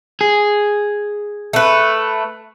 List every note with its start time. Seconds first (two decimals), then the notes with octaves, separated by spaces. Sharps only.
0.21 G#4
1.53 A3 B4